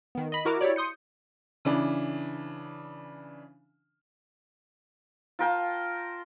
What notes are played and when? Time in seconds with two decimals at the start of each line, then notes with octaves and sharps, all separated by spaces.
0.15 D#3 B3
0.32 D#5 B5
0.45 E4 F#4 A#4 A#5 D6
0.61 E4 G4 C#5 D5
0.76 C6 D#6 G6 C#7
1.65 C#3 E3 D4
5.39 F4 A#4 G5 A5